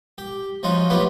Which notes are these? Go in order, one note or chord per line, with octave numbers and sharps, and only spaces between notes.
G4
F3 C#4 D#4 F4 F#4
F#3 A3 B3 E4 F4 G4